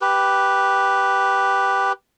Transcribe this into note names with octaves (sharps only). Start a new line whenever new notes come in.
G4 B4